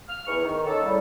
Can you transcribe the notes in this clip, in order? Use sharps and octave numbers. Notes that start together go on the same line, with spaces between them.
F6
E2 E3 C#6
D#3
D#3 A#3 C#4 D#4 A4
A2 C#3 G3